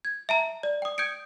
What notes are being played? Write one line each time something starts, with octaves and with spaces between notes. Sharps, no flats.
G#6
E5 A5 A#5
D5
G5 D#6
D#6 G6 G#6 C#7 D7